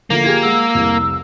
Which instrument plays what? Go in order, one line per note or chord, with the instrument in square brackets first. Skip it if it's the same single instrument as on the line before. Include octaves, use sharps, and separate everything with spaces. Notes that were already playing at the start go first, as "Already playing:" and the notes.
[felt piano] D3 F3 A3 [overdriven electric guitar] A#3
[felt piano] F4 G4 G#4 [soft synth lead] G#6
[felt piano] G#3 G#4 F#5 [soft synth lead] E6
[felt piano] F1 C2